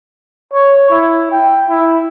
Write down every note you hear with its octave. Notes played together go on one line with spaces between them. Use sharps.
C#5
E4
G5
E4